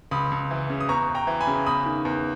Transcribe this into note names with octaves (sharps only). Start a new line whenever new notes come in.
C#2 B5 D#6
C#2
E3
C#3
D#6
E2 A#5 C#6
E2
G5 A#5
E3
G#5 B5
C#3
E2 B5 D#6
D#3
E2